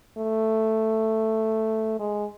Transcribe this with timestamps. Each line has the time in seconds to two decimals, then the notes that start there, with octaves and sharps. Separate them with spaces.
0.18 A3
1.99 G#3